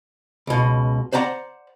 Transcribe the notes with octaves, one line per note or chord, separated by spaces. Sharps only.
C#2 B2
C5 D5 F#5 A#5